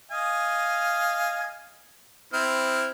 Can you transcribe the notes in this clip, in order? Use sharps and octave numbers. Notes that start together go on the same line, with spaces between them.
D#5 F5 G#5
C4 E4 F6